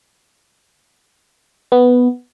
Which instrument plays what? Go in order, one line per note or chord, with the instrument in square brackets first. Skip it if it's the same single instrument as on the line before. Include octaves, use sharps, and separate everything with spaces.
[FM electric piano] B3